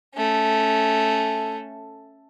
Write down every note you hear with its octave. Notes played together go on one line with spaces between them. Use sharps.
A3 C#4